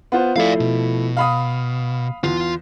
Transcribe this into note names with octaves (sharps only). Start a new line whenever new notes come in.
B3 F4 C5
F3 A3 E4 D5 F5
B2
F5 B5 D#6
E2 F4